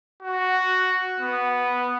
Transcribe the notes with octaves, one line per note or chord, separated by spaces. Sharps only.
F#4
B3